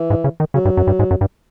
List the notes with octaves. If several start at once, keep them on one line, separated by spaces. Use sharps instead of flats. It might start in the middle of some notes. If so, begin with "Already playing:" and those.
Already playing: E3
G#2
C#3
D#3
C#3 F#3
G2
F#2
G2
G#2
F#2
G2